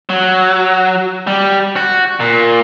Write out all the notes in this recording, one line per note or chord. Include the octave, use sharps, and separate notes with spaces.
F#3
G3
F#4
A#2